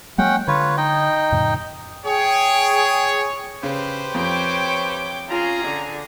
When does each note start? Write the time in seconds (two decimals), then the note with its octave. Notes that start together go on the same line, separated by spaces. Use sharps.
0.18 F#3 G#3 A#3 C#4 F#5 G5
0.47 D3 F4 B4 C#5
0.77 D#4 D#5 G5
1.32 F2 A2 C#3
2.05 G#4 C#5 G5
3.63 C#3 G4 B4 C5
4.14 F2 C#5 G5 D6
5.30 C#4 F4 G#4 A#5
5.65 D3